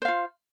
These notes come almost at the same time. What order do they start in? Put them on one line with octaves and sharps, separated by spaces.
C5 F5 F4